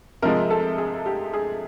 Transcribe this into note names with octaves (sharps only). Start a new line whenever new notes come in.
C3 F3 G#3 A#4
A4
G#4
G4
G#4